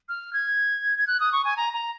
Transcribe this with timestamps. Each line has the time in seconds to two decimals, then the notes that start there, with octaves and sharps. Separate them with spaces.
0.09 F6
0.33 G#6
0.99 G#6
1.07 F#6
1.20 D#6
1.33 C#6
1.45 G#5
1.57 A#5
1.73 A#5